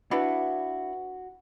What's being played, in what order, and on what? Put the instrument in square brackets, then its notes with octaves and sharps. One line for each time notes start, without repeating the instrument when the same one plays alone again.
[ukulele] D4 E4 B4 [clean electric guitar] F#4